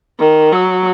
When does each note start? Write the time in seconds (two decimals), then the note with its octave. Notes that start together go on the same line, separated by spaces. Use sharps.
0.20 D#3
0.52 F#3